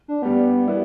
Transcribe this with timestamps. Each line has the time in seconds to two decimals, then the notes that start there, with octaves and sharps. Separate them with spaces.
0.08 D4
0.22 G2 G3 B3 D4 G4
0.67 G3 B3 E4